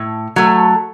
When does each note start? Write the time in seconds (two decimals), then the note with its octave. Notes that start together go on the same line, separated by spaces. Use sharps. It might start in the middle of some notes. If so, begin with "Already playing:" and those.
Already playing: A2
0.36 F#3 A3